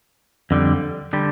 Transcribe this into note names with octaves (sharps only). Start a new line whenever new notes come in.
F2 D3 G3
D3 G3